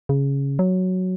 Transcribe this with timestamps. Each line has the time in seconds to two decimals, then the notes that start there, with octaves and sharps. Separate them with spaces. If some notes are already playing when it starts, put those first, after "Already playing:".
0.09 C#3
0.59 F#3